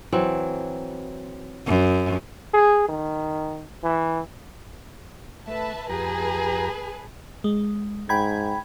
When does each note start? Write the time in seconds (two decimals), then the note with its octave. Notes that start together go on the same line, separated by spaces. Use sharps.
0.13 E3 F#3 C4
1.66 F#2
2.54 G#4
2.89 D#3
3.83 E3
5.47 A3 B4 E5 A5
5.90 F2 G4 G#4 B4 A5 A#5
7.44 G#3
8.09 G#2 G5 B5 G#6